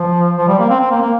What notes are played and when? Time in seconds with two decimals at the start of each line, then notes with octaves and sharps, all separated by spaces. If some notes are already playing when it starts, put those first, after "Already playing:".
Already playing: F3
0.38 F3
0.48 G3
0.59 A#3
0.70 C4
0.80 C4
0.91 A#3
1.02 A#3